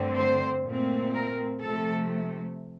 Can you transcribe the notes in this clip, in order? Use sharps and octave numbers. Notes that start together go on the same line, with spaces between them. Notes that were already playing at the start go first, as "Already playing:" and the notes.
Already playing: G2 D3 A3 C4
C5
A#2 A3 C4
A#4
C3 F3 A3 A4